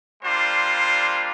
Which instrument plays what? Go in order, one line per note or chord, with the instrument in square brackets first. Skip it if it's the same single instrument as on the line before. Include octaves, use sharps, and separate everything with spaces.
[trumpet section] G3 A#3 D4 F4 C5